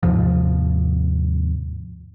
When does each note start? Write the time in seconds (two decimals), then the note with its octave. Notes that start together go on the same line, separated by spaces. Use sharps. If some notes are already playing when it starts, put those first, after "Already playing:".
0.03 D#2 G#2 C3 F3